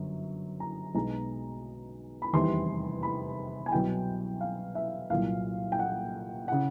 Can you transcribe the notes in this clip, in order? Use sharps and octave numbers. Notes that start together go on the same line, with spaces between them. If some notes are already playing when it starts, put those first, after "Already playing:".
Already playing: G1 F#2 F#3
A#5
B1 B2 G#3 A#5
B5
F1 E2 C3 D#3 G3 C6
B5
G#5
C2 B2 F#3 G5
F5
E5
C2 A#2 F#3 F5
G5
F#5
C#3 F#5